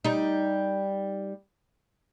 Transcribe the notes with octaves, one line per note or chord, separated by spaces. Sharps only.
G3 D#4